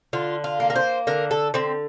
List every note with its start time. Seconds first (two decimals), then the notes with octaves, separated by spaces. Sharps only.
0.13 D3 F4
0.44 F4
0.60 A#3
0.70 A#4
0.76 C5
1.07 D3 A#4
1.31 A4
1.54 D3 C4